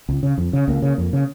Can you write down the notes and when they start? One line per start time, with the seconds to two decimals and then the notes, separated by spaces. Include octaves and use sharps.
0.09 C#2
0.23 C#3
0.38 F2
0.53 C#3
0.68 C#2 A#3
0.82 C#3
0.98 F2
1.13 C#3